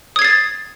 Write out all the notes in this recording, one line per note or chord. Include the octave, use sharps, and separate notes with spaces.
D#6 G#6 A6 C7